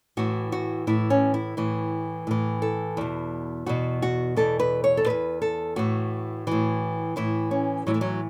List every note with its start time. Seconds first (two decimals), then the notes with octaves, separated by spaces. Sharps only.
0.17 A2 E3 F#4
0.52 F#4
0.87 A2 E3 E4
1.10 C#4
1.34 E4
1.57 A2 E3
2.27 A2 E3
2.62 A4
2.97 E2 B2
3.66 E2 B2 F#4
4.02 F#4
4.36 E2 B2 A4
4.60 B4
4.84 C#5
4.97 A4
5.06 B2 B4
5.10 E2
5.42 A4
5.76 A2 E3 F#4
6.47 A2 E3
7.16 A2 E3 E4
7.51 C#4
7.86 A2 E3 F#3
7.94 A3
8.01 F#3